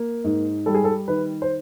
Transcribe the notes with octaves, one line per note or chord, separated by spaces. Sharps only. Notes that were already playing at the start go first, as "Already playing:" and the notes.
Already playing: A#3
G#2
G3 A4
G#4
A4
D#3 B4
C5